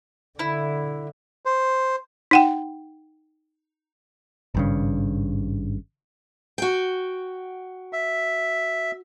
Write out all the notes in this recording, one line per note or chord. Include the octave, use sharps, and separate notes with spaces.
D3 E4
C5
D#4 F#5 G5
G#1 G2 C#3
F#4 G5
E5